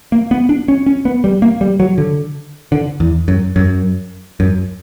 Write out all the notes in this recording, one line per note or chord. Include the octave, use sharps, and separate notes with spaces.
A#3
B3
D4
C#4
C#4
B3
G3
A#3
G3
F#3
D3
D3
E2
F#2
F#2
F#2